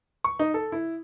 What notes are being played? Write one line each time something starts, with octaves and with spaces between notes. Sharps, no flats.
C#6
D#4
A4
E4